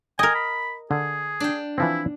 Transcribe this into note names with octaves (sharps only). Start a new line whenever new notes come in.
A#4 D#5 G5 G#5
B5
D3 G#4
D4 G5
E3 F3 C4 E4